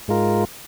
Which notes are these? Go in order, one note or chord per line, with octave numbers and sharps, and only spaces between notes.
G#2 G#3 F4 A#4